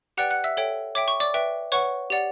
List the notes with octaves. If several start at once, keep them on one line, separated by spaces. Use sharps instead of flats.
G4 B4 D5 F#5 G5 F#6
F#5 F#6
E5 E6
A4 C#5 E5 G5
C#5 E5 G5 D6
C#6
D5 D6
B4 E5 G5
B4 C#5 F#5 C#6
G4 D5 F#5